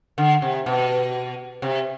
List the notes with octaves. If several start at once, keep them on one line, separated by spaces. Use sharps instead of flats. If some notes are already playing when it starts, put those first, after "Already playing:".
D3
C3
B2
C3